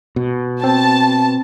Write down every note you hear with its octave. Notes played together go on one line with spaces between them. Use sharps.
B2
C4 A5